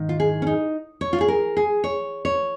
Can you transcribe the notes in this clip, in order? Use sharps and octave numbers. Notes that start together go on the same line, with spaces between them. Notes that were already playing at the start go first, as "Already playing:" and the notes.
Already playing: G#2 D#3
F4
G#4
C#4
D#4
C#5
F4
G#4
A#4
G#4
C#5
C#5